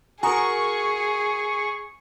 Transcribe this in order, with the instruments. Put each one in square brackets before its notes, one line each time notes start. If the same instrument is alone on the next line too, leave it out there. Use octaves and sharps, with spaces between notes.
[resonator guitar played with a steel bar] F#4 A#4 [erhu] G#4 [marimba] G#5 A#5 D#6 [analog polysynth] C#6